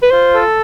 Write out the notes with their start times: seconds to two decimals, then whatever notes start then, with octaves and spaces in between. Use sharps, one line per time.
0.03 B4
0.11 F4 C5
0.34 A4